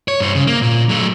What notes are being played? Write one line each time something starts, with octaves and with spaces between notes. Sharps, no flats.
C#5
G2 C5
C#3
A#3
A#2
F#3 A3